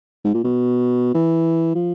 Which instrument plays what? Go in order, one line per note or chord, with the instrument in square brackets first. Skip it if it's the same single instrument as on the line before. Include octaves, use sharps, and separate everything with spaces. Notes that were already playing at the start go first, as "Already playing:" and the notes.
[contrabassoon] G#2
A#2
B2
E3
F3